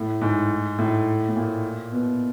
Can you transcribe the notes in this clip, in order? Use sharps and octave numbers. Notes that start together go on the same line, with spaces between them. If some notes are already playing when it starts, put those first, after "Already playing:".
Already playing: A2
G#2
A2
A2
A#2
B2